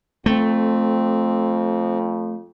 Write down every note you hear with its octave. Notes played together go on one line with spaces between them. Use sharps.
F2 A3 C4